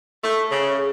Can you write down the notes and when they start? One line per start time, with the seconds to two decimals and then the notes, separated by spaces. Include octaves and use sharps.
0.23 A3
0.50 C#3